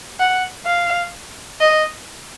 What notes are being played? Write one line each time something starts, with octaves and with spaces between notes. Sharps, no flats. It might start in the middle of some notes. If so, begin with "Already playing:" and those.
F#5
F5
D#5